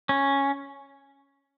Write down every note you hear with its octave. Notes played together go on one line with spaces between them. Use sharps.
C#4